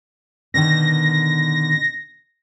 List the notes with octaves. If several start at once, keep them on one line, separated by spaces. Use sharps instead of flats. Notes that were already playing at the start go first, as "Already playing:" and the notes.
B2 D3 D#3 A#6